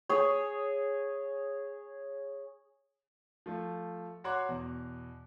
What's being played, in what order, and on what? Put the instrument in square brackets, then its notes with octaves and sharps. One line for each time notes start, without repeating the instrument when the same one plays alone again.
[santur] G#4 C#5
[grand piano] F3 A3
F#4 C#5 A#5 C6 D6 F#6
E2 B2